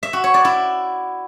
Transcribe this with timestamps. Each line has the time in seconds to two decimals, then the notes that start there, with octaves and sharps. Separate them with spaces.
0.03 E5
0.13 F#4
0.24 C#5
0.34 D5
0.45 E4